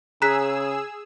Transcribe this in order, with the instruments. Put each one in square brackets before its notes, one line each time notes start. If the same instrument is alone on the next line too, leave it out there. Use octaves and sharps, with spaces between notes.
[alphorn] C#3 [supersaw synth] G#4 E6 [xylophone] A#5 F#6 B6